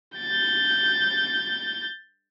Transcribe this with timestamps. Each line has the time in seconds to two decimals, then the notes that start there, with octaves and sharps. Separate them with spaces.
0.17 G6 A6